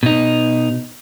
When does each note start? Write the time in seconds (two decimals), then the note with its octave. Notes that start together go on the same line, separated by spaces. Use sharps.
0.03 B2 D#4